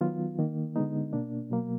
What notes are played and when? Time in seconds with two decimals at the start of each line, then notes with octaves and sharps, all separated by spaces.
0.01 D#3 F#3 B3 F4
0.39 D#3 A#3
0.76 D3 G#3 B3 D#4
1.13 B2 A#3 D4
1.51 B2 F#3 A#3